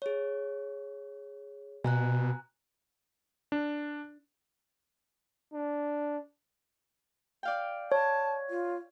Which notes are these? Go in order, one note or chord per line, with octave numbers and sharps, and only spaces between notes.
G#4 C#5
B2 G#5 A#5 F#6
D4
D4
D5 F5 G5
C#5 A5
F4